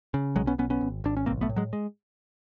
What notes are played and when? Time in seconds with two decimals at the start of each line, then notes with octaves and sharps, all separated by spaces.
0.14 C#3
0.36 B1 F#3 G#3
0.47 B3 C#4
0.58 B1 B3 C#4
0.70 B3 C#4
0.81 G#1
1.04 G#1 D4
1.17 C#4
1.26 B1 A#3 C4
1.41 A3 B3
1.49 A2
1.56 F#3 G#3
1.73 G#3